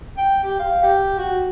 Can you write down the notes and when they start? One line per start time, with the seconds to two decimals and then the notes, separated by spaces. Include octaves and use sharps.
0.17 G5
0.44 G4
0.60 F5
0.83 G4
1.18 F#4